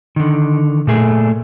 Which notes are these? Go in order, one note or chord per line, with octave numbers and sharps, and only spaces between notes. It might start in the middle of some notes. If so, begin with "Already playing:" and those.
D3 D#3
A#2 A3 G#4